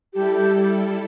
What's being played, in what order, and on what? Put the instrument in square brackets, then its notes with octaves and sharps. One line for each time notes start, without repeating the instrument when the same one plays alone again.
[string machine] G3 E4 A4 [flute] G4